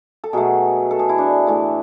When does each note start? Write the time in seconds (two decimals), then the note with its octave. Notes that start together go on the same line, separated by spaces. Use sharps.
0.24 A4
0.33 B2 F#3 A3 G#4
0.91 A4
0.99 G#4
1.09 E4
1.18 D4
1.47 A2 E3 A3